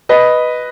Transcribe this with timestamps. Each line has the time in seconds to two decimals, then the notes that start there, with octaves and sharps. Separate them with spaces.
0.09 B4 D#5